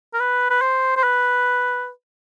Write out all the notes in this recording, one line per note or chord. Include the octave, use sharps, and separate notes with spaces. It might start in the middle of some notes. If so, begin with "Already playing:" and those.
A#4
B4
B4
C5
C5
B4